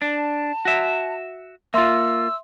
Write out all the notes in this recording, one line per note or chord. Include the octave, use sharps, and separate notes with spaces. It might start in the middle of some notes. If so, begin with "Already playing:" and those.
D4 A5
F#4 E5
A#3 F4 E5 C6 E6